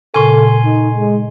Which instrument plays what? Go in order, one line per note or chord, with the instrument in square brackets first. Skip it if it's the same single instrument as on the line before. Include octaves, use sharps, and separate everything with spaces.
[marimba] A#2 C#3 C#6 [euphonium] A4 [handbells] G#5 C6
[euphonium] D#4
G#3